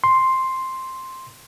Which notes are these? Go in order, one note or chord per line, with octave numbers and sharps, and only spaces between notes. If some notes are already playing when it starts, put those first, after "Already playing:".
C6